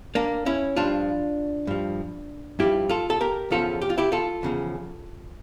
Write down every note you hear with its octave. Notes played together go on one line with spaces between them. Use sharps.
A#3 D4
C#4 E4
G2 F3 D4 F4
G2 F3
G2 F3 E4 G4
F4 A4
A4
G4 A#4
E2 C#3 F3 F4 A4
G4
F4
E4 G4
F4 A4
E2 C#3 F3